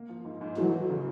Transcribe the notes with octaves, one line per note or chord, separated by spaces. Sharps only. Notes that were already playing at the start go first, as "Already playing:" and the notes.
Already playing: A#3
F3
G#2
G#2
E3 F#3 A3
F#3
C#3